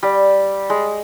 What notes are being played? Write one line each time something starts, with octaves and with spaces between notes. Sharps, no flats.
G3
G#3